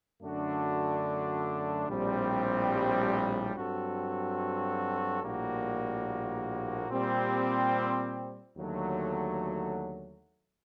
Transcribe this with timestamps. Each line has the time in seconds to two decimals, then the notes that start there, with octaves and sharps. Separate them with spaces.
0.21 F#2 D3 A3 D4 F#4
1.87 A#1 A2 G3 C4
3.55 G2 F#3 C4 F#4 A4
5.22 A#1 A2 G3 A#3 F#4
6.89 A#2 G3 C4 G4
8.56 D#2 D3 F#3 A3